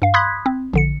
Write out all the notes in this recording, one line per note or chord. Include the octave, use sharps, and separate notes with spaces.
G2 F5
B5 C6 D#6 F#6 G#6 B6
C4
A#1 D3 C#7